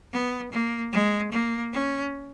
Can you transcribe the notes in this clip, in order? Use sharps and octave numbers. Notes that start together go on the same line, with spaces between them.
B3
A#3
G#3
A#3
C#4